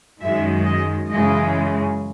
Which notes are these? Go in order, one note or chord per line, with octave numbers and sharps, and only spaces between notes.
F#2 D#3 G#3 E5
D#5
F#2 C#3 E3 G#3 D#5